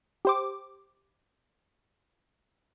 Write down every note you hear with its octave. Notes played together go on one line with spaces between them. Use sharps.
G4 C5 D6